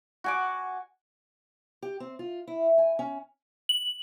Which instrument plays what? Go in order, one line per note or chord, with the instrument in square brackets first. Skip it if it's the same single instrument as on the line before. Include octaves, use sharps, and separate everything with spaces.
[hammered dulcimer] F#4 G#5 D6
[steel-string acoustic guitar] G4
C4
F4
E4
G#5
C#4
[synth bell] F#7